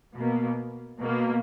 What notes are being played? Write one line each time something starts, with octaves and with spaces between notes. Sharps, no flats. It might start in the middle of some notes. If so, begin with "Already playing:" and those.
B2 A#3
B2 A#3